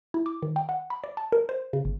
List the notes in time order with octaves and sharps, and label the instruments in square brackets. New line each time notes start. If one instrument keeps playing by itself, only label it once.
[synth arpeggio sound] E4
D6
D#3
G5
F#5
B5
D5
A5
A#4
C5
C#3
G1